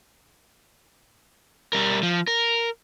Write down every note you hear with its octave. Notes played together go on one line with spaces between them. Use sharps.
G3 A#4
F3
A#4